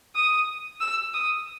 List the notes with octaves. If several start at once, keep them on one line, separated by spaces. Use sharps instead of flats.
D#6
E6
D#6